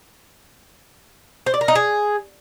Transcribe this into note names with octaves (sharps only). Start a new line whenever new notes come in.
C5
D5
A#4
D#4
G#4